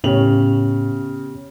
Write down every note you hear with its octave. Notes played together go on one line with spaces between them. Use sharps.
A2 C#3 B3 G4 C#5 F7 F#7